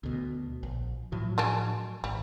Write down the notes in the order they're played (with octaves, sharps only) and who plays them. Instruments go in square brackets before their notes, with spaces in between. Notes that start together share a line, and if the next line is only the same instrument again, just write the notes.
[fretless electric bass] D2 B2
A#1
A2 F3 F#3
[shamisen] G#3 C#4 D4
[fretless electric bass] G#1 [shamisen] G3